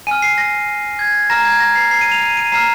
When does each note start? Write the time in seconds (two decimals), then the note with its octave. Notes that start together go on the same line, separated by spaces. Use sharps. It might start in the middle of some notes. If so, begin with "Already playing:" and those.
0.07 G#5 F6 D#7
0.22 C7
0.38 A#6
0.99 G#6
1.30 A#5 F6 A#6
1.45 G#6
1.60 A#6
1.75 C7
1.91 C7
2.01 D#7
2.12 F7
2.21 D#7
2.37 D#7
2.52 A#5 F6 C7